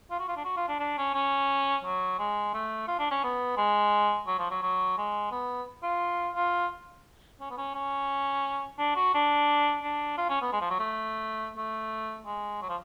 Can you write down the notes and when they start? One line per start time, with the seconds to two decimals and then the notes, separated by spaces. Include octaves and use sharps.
0.11 F4
0.19 F#4
0.28 F4
0.37 D4
0.45 F#4
0.57 F4
0.69 D4
0.79 D4
0.98 C#4
1.14 C#4
1.84 F#3
2.19 G#3
2.54 A3
2.88 F4
2.99 D4
3.11 C#4
3.24 B3
3.57 G#3
4.27 F#3
4.39 F3
4.51 F#3
4.63 F#3
4.97 G#3
5.31 B3
5.83 F4
6.35 F4
7.40 C#4
7.50 B3
7.58 C#4
7.75 C#4
8.79 D4
8.96 F#4
9.14 D4
9.83 D4
10.17 F4
10.29 C#4
10.41 B3
10.52 G#3
10.61 F3
10.70 F#3
10.79 A3
11.57 A3
12.26 G#3
12.62 F#3
12.69 F3